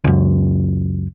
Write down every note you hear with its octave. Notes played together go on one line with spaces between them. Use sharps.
C#2 F#2